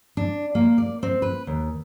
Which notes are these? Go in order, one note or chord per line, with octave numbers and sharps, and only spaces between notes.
D4
A#3
D5
C4
B4
D#2